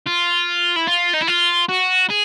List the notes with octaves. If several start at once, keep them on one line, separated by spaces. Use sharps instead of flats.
F4
E4
F4
D#4
E4
F4
F#4
G#4